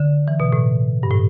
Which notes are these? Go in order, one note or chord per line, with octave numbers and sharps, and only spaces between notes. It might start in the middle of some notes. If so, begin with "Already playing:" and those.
Already playing: D3
E3
B2
A2
G2
A2